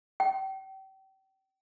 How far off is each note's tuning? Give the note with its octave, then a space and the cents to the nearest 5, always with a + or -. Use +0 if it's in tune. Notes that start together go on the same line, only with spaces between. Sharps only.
G5 -35